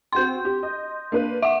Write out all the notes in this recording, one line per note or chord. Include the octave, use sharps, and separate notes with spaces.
C4 F#4 G5 C6 G6
G4
D#5
A#3 D4 B4
E5 F#5 D6